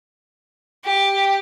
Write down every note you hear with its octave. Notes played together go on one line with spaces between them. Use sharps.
G4